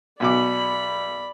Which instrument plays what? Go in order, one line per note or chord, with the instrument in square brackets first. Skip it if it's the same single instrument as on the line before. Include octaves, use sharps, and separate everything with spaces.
[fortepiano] B1 B2 D6 [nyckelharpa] D5 B5